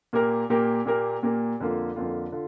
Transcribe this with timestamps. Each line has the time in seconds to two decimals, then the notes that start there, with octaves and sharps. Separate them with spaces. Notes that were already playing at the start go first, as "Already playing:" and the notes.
0.13 A#2 A#3 G4 A#4
0.50 A#2 A#3 G4 A#4
0.86 A#2 A#3 G4 A#4
1.23 A#2 A#3 G4 A#4
1.60 F2 D3 A#3 F4
1.96 F2 D3 A#3 F4
2.32 D3 F4